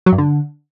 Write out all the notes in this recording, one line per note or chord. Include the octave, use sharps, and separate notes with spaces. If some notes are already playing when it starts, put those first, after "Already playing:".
F#3
G2
D3